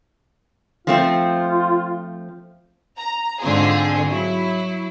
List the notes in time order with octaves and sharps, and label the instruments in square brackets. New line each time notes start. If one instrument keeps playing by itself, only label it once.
[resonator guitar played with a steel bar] F3 A3 C4 [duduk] F4
[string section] A#5
G#2 D3 C4 F4 G#4
F#3 E4